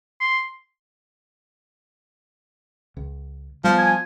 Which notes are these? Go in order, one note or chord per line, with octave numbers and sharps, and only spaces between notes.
C6
C#2
F3 G3 B3
G#5